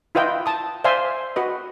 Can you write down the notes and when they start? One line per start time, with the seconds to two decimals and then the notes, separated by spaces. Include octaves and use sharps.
0.15 E4 F4 B4 D#5 G5
0.46 A5 D#6
0.84 C5 D5 E5 F5 G#5 C6
1.36 F#4 B4 D#5